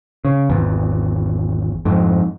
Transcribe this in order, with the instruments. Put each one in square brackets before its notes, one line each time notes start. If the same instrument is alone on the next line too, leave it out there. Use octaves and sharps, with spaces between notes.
[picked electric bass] C#3
G#1 E2
F2 G#2